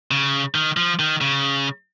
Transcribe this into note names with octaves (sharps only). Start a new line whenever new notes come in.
C#3
D#3
F3
D#3
C#3